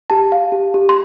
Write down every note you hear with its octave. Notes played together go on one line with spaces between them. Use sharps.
G4 A5
F5
G4
G4
C6